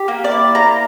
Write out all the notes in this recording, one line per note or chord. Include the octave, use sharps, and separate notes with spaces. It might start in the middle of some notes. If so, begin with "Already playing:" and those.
Already playing: G4
A#3
D5
E4
A#3 A#5